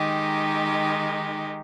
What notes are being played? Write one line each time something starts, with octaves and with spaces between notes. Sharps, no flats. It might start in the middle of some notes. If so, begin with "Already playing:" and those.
Already playing: D#3 G#3 D#4 G4